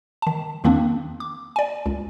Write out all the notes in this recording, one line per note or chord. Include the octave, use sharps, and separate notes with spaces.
D#3 A5
E2 D#3 A#3 C4 D4
D6
D5 G#5
C#2